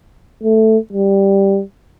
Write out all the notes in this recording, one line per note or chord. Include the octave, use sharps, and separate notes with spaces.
A3
G3